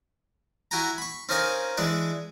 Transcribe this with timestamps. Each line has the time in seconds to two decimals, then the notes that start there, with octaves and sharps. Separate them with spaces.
0.71 E4 F#4 G5 G#5 A#5
0.98 B5 C#6
1.29 C4 C#4 D#4 A#4 F5 G#5
1.77 E3 G#3 D4 D5